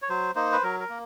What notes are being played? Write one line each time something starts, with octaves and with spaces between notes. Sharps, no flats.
C#5
F#3 C5
A#3 D#4 C5
B4
F#3 A#4
A#4
A#3